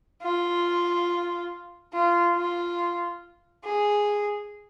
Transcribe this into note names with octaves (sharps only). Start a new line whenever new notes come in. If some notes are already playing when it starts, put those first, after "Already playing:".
F4
F4
F4
G#4